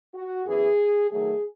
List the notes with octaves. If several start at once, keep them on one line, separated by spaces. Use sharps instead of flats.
F#4
F#2 E3 B3 G#4
D#3 F#3 A3 G#4